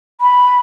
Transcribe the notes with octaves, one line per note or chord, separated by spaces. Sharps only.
B5